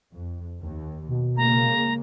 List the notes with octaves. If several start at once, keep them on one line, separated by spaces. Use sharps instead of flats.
F2
D#2
B2
C#3 G#3 A#3 A#5